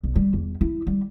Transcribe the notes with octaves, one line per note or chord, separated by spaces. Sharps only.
B1
G3
E2
E4
G3